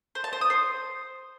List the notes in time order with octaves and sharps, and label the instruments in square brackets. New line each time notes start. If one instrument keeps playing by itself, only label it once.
[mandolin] C5
A5
C5
D#6
C5